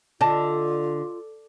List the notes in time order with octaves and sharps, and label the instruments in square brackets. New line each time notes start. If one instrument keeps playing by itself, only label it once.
[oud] D3 [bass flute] F4 [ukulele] D5 D#5 A5